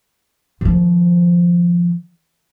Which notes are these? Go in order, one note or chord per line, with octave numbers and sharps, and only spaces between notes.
D#3 F3